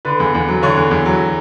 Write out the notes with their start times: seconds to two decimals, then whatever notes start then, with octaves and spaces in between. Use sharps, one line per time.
0.05 D3 B4
0.20 E2
0.34 E2
0.48 F#3
0.62 D3 C#5
0.77 E2
0.91 E2
1.06 F#3